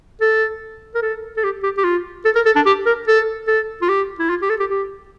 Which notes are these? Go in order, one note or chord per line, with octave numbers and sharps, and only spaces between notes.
A4
A#4
A4
A4
G4
G4
G4
F4
A4
A#4
A4
D4
G4
A#4
A4
A4
F4
G4
E4
F4
G4
A4
G4
G4